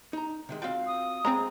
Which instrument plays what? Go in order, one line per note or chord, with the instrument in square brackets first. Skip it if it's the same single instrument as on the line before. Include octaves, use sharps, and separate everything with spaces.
[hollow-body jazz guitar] D#4 A#5
C3 D#3 G#3
[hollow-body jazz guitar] C4 F#4 G5 [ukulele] F4 F5
[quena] D#6
[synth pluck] G#3 C4 [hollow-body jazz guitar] G#4 C#5 [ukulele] A#5